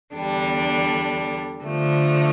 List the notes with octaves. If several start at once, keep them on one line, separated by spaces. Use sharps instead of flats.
E2 D3 G3 D4
D3 F3 A3